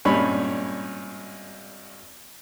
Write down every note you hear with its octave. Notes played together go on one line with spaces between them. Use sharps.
G#1 G2 A#2 C#4 C#5 B5